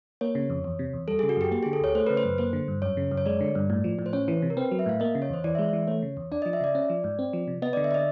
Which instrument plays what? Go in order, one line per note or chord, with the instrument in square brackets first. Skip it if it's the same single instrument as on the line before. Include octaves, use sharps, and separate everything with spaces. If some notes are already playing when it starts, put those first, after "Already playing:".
[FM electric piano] A#3 [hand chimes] C#5
[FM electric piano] C#3
F2
E2
C3
E2
[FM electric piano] G3 [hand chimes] A4
[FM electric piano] C#3 [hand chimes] G#4
[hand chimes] F#4
[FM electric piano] F#2 [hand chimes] G4
[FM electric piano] A#3 [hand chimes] G4
[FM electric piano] D3 [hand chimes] G#4
[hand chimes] A4
[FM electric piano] D2 [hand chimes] C#5
[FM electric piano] A3 [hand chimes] C5
[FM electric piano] C#3 [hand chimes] B4
[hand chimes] C5
[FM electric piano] F#2
[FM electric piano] A#3 [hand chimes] C5
[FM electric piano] D3
G2
[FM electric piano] F#2 [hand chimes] C#5
[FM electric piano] C#3
F#2
[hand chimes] C#5
[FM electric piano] G#3 [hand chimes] D5
[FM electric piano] D3
G2
A2
F3
A2
[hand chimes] C5
[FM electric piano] C#4 [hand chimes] C#5
[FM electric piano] E3
C3
[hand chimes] A#4
[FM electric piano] C4 [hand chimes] B4
[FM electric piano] F#3
[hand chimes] E5
[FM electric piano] A2 [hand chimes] F5
[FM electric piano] A#3 [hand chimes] D#5
[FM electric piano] C#3
[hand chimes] C#5
[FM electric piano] E2 [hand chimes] C5
[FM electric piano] E3 [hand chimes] D5
[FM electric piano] G#3 [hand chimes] E5
[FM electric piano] E3
[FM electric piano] A3 [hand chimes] C#5
[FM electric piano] C#3
E2
[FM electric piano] D4 [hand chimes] D5
[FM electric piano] F3 [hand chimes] D#5
[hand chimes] E5
[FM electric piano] C#3 [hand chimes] D5
[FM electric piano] C#4
F3
G#2
C4
F3
C3
[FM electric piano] B3 [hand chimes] D#5
[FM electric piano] D3 [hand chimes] D5
[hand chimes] E5
D5
D#5